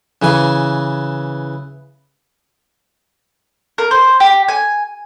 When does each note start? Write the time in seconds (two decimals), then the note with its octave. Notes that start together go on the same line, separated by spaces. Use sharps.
0.22 C#3 E3 G#5
3.78 A#4
3.91 C5
4.20 G4
4.48 G#5